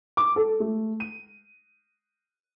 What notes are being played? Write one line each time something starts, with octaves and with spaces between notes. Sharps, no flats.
D6
A4
A3
D#7